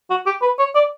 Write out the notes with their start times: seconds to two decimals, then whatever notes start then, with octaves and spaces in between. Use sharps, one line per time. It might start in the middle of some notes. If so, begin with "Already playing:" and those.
0.10 F#4
0.26 G4
0.42 B4
0.59 C#5
0.75 D5